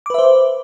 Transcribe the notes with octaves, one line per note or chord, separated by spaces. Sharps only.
B4 C5 E5 D6